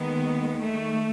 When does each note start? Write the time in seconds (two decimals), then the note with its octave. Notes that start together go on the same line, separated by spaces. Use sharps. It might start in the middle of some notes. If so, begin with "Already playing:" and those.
Already playing: D#2 D#3 G#3 B3
0.58 A3